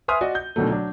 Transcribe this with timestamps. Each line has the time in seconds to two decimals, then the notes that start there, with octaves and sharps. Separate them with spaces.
0.08 B4 E5 G#5 C6 D#6 F6
0.21 F#4 D5 D#5
0.35 G6
0.56 B2 D3 D#3 F#3 A3
0.70 F#3 D4